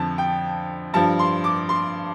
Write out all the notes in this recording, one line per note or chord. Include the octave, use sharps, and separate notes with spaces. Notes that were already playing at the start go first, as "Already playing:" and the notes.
Already playing: F2 D3 F3 A5
G5
G2 F3 A5
C6
D6
C6